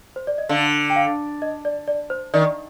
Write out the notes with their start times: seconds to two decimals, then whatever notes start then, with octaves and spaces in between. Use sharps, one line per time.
0.16 C5
0.27 D5
0.38 D#5
0.49 D3 F5
0.90 G5
0.96 F5
1.42 D#5
1.65 D5
1.88 D5
2.10 C5
2.34 D#3 D5